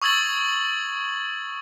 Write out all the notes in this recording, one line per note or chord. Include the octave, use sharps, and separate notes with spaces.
C#6 D#6 E6 G#6 A6 F#7